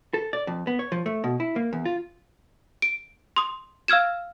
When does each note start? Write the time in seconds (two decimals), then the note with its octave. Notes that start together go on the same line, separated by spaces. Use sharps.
0.14 A4
0.33 D5
0.47 F2
0.67 B3
0.79 C#5
0.92 F3
1.06 A3
1.24 B2
1.40 E4
1.56 A#3
1.73 E2
1.85 F4
2.82 D7
3.36 C6 D#6
3.88 F5 E6 F6 G#6 E7